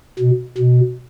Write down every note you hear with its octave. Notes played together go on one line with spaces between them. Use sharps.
B2
B2